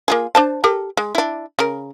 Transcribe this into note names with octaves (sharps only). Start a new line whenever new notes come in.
A#3 F4 G#4
D4 C5 A5
G4 A4 A#4
G#3
D4 E4
C#3 A#4